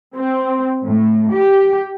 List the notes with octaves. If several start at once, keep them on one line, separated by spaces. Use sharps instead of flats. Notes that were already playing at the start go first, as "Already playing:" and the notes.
C4
A2
G4